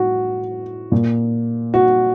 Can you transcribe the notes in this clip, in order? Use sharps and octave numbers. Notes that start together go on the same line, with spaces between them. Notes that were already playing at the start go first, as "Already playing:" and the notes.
Already playing: A2 F#4
A#2
F#4